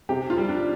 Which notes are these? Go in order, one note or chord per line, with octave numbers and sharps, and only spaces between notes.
C3 G4
F4
G3
D4